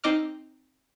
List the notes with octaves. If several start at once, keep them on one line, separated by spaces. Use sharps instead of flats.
C4 D#4 D#5 D6 F6